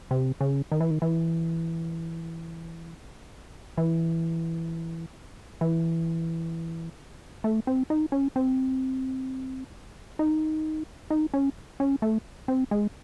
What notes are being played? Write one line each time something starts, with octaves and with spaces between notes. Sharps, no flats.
C3
C#3
D#3
E3
D#3
E3
E3
E3
A3
C4
D#4
C#4
C4
D#4
D#4
C#4
C#4
A3
C4
G#3